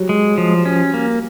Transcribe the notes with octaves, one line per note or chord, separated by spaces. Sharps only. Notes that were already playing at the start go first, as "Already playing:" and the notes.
Already playing: F#3 G3
G#3
F3
C#4
A#3